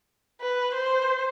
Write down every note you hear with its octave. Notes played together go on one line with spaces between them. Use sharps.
B4
C5